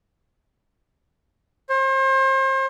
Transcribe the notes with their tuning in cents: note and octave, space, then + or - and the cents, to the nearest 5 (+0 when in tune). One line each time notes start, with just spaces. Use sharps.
C5 +35